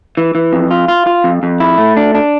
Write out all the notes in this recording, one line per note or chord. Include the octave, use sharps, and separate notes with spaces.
E3
E3
F2
F4
F4
F4
F2
F2
E4
A3
D4
D4